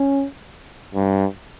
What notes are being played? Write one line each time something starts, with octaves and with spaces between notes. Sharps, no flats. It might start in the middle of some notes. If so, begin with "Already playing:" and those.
Already playing: C#4
G2